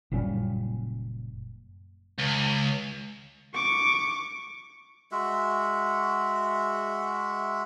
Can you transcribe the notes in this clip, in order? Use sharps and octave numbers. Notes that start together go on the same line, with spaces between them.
F#1 A#2 G3 C#4
C#2
C#6 D6
G#3 F#4 E5